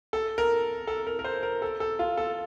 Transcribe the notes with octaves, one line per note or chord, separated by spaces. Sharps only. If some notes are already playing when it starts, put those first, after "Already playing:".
A4
A#4
A4
A#4
A#4
C5
A#4
A4
A4
F4
A4